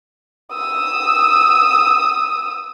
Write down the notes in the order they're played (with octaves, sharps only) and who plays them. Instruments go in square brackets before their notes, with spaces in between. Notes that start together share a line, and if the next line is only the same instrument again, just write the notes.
[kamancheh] D#6 E6